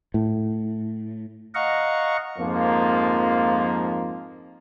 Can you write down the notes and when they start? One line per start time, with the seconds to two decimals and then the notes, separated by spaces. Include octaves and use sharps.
0.14 A2
1.55 D#5 F5 F#5 A#5 C#6
2.38 F2 G#2 F3 A#3